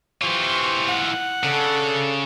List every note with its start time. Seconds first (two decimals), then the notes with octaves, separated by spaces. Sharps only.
0.21 E3 F4 G4 C5 C#6
0.89 F#5
1.43 C#3 D4 A4